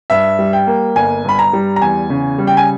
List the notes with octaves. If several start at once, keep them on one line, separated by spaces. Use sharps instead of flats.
G2 E5
G3
G5
A#3
G1 G#5
G2 B5
A#5
G3
A#5
E2 G#5
C#3
G3
G5
G#5